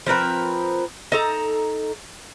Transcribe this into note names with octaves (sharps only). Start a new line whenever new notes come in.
F3 C4 A#4 B4
D#4 A4 A#5